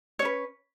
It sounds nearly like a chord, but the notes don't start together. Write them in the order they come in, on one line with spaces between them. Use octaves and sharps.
C#5 C#4 B4